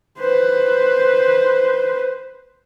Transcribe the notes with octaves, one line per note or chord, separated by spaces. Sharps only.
B4 C5